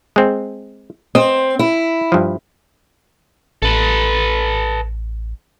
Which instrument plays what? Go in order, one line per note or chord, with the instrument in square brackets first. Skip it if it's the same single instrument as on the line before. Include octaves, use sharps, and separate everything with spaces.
[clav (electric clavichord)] G#3 C4
[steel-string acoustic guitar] C4 [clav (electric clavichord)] D#5
[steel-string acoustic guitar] E4
[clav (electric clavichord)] G2 F3
[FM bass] A1 [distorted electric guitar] A4 B4